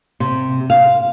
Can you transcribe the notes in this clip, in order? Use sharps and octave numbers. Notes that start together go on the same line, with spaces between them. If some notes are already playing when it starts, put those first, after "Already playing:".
C3
F5